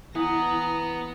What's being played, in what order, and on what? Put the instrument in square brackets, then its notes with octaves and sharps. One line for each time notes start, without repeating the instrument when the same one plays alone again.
[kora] E3 [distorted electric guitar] B3 [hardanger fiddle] A#5 [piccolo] D#6